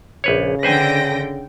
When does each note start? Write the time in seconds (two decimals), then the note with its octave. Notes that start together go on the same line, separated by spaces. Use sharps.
0.24 A#1 C#3 B4 C#5
0.63 D3 B4 C5 G5 G#5 A#6